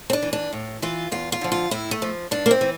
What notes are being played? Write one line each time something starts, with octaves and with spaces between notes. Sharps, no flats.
C4
D4
E3
D4
A2
E3 F4
E2 F4
F4
D3 F3
F4
A2 E4
A3
F3
G2 D4
A#3
C4
E3